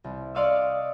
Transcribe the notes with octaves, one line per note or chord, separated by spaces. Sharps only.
C2
D5 D#5 F5 C6 C#6 E6